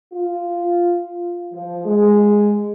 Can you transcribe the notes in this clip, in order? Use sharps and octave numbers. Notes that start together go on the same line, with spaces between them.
F4
F3
G#3